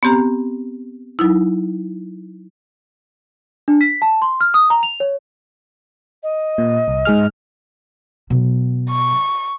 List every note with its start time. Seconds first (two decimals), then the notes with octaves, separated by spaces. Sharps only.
0.03 B3 C4 G4 A#5
1.19 F#3 D#4 E4
3.68 D4
3.81 B6
4.02 A5
4.22 C6
4.41 F6
4.54 D#6
4.70 A#5
4.83 F7
5.00 C#5
6.23 D#5
6.58 A#2
6.88 C2
7.05 G#2 G#4 F6
8.30 B2 F#3
8.90 C#6